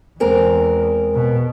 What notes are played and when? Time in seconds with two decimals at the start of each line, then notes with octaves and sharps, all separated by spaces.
0.20 E2 G#3 C4 A#4
1.15 B2